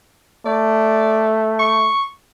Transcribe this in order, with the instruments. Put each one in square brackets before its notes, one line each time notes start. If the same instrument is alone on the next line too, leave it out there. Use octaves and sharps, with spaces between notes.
[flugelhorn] A3 [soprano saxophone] D5
[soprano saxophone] C#6